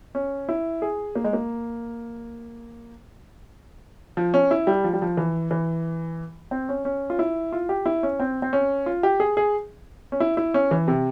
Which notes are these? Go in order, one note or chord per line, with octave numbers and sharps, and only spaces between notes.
C#4
E4
G#4
A#3
G#3
A#3
F3
C#4
E4
G3
F3
G3
F3
E3
E3
C4
C#4
C#4
F4
E4
F4
G4
E4
C#4
C4
C4
C#4
F4
G4
G#4
G#4
C#4
E4
E4
C#4
E3
C3